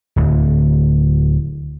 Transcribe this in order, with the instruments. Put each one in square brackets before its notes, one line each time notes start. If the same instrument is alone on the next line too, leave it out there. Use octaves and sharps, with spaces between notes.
[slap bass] D1 D2